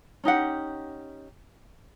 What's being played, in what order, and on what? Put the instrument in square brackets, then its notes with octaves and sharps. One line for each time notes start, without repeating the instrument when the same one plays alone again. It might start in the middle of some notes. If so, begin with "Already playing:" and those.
[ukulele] C#4 D#4 G4 F#5